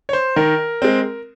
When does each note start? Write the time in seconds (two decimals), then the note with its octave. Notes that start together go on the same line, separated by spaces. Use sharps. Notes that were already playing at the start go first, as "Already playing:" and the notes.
0.09 C#5
0.13 C5
0.36 D#3 A#4
0.82 G#3 C4